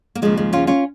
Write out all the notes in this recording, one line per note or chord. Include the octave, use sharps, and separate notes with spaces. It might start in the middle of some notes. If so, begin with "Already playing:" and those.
A#3
D#2 C#3 F3 G#3
G#3
C#4 F4
C#4 F4